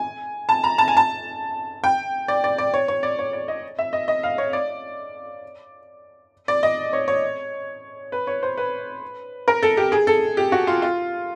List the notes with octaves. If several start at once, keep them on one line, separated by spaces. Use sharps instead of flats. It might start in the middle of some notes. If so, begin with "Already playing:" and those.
Already playing: G#5
A5
A#5
A5
G#5
A5
G5
D5
D5
D5
C#5
C#5
D5
C#5
D5
D#5
E5
D#5
D#5
F5
C#5
D5
D5
D#5
C#5
C#5
B4
C#5
C5
B4
A#4
A4
G4
G#4
A4
G4
F#4
F4
F4